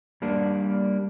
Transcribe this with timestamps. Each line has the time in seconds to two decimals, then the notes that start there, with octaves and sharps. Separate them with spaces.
0.22 G3 A#3 D4